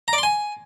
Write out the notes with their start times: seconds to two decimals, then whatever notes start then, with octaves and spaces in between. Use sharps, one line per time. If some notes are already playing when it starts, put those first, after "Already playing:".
0.08 A#5
0.13 D5
0.18 C6
0.23 G#5